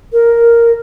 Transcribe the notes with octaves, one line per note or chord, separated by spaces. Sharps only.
A#4